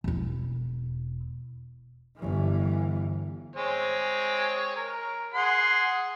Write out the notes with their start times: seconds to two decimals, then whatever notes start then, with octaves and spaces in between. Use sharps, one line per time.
0.04 E1 E4
2.17 G1 E3
3.55 G#3 C4 C#5
4.76 A#4
5.34 G#4 F#5 C6